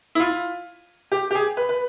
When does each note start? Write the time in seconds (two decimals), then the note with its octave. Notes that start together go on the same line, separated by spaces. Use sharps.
0.15 E4
0.20 F4
1.12 G4
1.31 G4
1.35 G#4
1.57 B4
1.69 B4